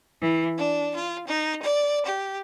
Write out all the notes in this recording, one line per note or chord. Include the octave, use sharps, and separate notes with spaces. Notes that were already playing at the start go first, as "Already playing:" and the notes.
E3
D4
F4
D#4
D5
G4